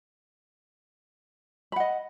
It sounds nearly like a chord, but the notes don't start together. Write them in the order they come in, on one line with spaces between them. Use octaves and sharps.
B5 F#5 D#5